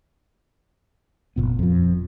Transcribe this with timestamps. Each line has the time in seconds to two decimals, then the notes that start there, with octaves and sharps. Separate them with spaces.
1.36 F#1 D#2 A#2 B3
1.59 F2 F3